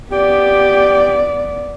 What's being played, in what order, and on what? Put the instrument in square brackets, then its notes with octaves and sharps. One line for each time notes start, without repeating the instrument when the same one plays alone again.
[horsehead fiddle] B3 D5 [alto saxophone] G4